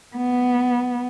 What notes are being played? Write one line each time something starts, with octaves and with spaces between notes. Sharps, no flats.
B3